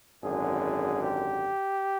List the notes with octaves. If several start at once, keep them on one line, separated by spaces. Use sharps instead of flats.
G#1 F#2 D3 G#4
G4